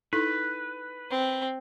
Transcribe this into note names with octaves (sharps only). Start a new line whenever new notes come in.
D#4 E4 A4 B4
C4